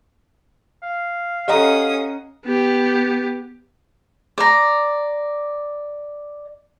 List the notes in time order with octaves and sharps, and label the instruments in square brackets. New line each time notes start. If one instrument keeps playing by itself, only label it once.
[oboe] F5
[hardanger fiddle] C#4 D#6 [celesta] G4 A4 [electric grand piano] D#5 F#5 A#5
[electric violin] B3 G4
[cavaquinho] D5 A#5